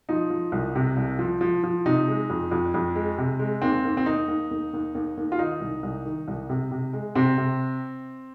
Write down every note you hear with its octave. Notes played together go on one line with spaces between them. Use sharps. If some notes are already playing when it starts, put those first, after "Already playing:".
F3 D#4
F3
C2
C3
C2
F3
F3
F3
C3 D#4
G#3
F2
F2
F2
G#3
C3
G#3
D#2 C4
D#2
C4
D#2 D#4
D#2
D#2
D#2
D#2
D#2
F4
D#3 D#4
C2
C2
D#3
C2
C3
C3
G#3
C3 C4
C3